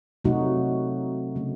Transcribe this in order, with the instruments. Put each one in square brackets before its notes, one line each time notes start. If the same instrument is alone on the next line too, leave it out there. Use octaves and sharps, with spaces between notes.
[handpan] C3 F#3 A3 D#4 F#4
C#3 F#3 A3